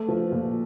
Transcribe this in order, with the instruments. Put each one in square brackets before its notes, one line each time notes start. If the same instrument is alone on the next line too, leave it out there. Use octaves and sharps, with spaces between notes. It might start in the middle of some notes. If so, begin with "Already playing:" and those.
Already playing: [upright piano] A3
F3
A#2